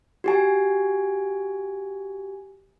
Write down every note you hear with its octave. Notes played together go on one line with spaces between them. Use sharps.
F#4 G4 G#5